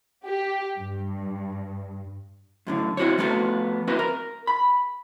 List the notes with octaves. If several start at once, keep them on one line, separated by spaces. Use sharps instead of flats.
G4
G2
F#2 A2 D3
C4 E4 F#4 C5 C#5
F3 A3 B3 C#4 F4 F#4
A#3 C4 E4 F#4 B4 D#5
A#4
B5